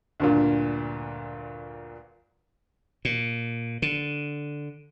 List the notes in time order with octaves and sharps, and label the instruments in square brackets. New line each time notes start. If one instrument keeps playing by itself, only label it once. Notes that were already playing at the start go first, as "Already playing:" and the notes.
[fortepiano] D2 G2 A#2
[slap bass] A#2
D3